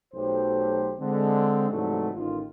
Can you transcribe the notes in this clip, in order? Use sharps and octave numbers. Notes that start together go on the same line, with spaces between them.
B1 F#3 A3 G4 C5
D3 G#3 C4
G#2 C3 E3 F#3 G3 A3
A1 D#3 F4